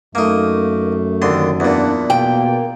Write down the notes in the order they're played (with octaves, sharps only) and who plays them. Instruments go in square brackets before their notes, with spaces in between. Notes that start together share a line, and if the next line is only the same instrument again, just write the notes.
[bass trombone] F#2 [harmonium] A3 [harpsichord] A#3 D#4
[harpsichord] D#2 D3 C6
[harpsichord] E2 A#2 [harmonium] D4 F#5
[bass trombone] B2 [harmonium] A#3 [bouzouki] G5